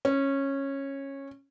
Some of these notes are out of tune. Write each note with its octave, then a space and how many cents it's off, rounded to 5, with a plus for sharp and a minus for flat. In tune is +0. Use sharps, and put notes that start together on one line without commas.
C#4 -15